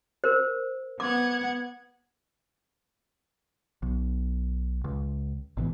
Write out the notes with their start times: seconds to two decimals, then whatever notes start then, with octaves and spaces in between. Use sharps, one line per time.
0.24 A#4 C5
1.00 B3 F#5 D6 G#6
3.82 B1
4.84 C#2
5.57 G#1 B2 D3 E3